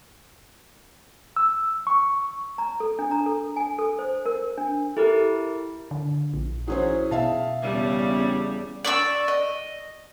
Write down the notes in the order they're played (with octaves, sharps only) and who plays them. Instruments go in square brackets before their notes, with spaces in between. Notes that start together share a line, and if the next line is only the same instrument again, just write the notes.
[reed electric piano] E6
C#6
[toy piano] A#5
A4
D4
A#5
A4
G#5
A4
C5
A#4
D4
[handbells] E4 G4 A#4 [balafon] A4
[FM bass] D3
A#1
[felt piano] E3 C#4 C5 [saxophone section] F#3 G#4
[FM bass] B2 [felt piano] E5 F5 A5
[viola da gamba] E2 G3 [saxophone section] C#3
[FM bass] C#4
[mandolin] D5 C#6 E6
D#5